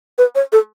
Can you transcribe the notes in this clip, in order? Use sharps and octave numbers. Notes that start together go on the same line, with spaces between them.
B4
C#5
A4